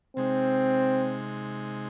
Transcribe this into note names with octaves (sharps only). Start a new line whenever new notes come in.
C3 G#3 C4 D#4